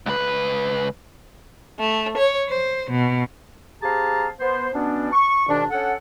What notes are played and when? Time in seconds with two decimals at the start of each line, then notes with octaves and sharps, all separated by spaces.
0.06 C#2 B4
1.79 A3
2.16 C#5
2.49 C5
2.90 B2
3.82 C4 G4 G#4 F5 A5 A#5
4.40 B3 C5
4.73 B2 B3 C#4 D4
5.12 C#6
5.48 G#2 B2 D#3 D4
5.71 C#4 D4 A4 F#5